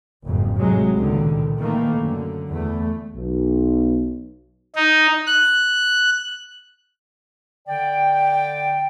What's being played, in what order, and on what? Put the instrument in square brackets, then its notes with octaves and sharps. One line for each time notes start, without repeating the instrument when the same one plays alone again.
[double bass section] F#1 F2 G#2
A1 C3 F#3 G#3
C#2 A#2 D3 D#3
D#3 E3 A3 A#3
F#2 D3
E2 A3
[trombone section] B1
[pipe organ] D#4
F#6
[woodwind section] D3 D5 G5